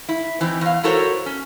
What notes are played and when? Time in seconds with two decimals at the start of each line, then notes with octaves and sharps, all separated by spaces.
0.09 E4
0.41 E3 C4 D#4
0.61 E2 F5
0.83 E4 F#4 A4 A#4 C5 C#5
1.26 C#4